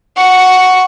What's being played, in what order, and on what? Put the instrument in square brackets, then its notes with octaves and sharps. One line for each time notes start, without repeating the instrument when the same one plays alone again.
[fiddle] F#5 C#6